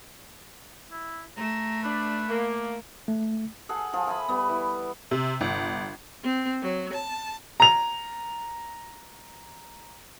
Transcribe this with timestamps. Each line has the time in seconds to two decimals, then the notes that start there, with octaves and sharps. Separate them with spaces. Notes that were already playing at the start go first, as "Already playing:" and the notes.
0.92 E4
1.37 A3 A#5
1.84 D4 B4
2.29 A#3
3.08 A3
3.69 G#4 A4 F#5 A5
3.93 F3 G#4
4.07 E5 G#5 B5
4.29 G3 B3
4.49 E3
5.11 C3
5.41 G1
6.23 C4
6.61 F#3
6.93 A5
7.60 A#5 F7